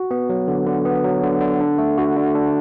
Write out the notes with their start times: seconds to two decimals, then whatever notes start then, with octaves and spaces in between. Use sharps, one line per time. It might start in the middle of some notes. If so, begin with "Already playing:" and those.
Already playing: F#4
0.11 B3
0.29 F#3
0.48 D3
0.67 D3
0.85 B3
1.04 F#3
1.23 D3
1.41 D3
1.60 D4
1.78 A3
1.98 D3 F#4
2.16 D3
2.35 D4